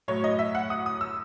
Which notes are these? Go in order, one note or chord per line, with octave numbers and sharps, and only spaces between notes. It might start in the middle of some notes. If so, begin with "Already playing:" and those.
A2 F#3 C#5
D#5
E5
F#5
D#6
D#6
E6